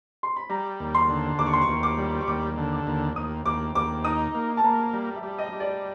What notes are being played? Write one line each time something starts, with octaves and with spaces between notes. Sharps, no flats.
C6
B5
G3 A#5
D#2
C6
D3
D#2 D6
C#6
C6
C#6
D#2
D6
G3
C#6
D#2 D6
D3
D6
D#2
D#2 D#6
D#2 D6
D#2 D6
D#4 D#6
A#3
A5
A#3 A#5
G3 A#5
E5
G3
D#5
G3
D5